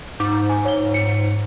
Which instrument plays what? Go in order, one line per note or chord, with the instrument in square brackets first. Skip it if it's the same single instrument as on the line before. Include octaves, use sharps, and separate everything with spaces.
[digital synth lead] G#2 [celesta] D6
[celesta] G#5
C#5 G7
C#7